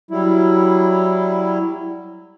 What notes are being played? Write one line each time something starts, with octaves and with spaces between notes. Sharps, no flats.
F#3 G3 E4